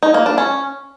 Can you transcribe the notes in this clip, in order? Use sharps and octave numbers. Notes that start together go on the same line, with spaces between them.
D#4
A#3
D4
C#4